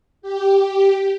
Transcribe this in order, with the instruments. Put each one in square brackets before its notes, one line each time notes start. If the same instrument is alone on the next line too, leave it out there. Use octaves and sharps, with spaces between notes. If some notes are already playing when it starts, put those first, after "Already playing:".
[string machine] G4